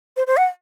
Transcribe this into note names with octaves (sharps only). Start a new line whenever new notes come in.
C5
C5
F#5